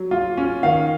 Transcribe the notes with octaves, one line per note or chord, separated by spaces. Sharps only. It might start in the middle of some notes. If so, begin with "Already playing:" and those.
Already playing: F#3
F4
C#4
D#3 F5